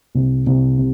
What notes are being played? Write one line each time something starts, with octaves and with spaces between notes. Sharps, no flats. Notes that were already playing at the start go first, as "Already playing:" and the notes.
C2
C2
C3